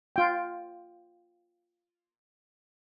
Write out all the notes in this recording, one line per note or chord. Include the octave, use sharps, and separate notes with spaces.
F4 G5